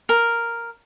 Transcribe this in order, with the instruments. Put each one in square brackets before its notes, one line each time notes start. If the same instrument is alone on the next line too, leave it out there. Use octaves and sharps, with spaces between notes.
[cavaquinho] A#4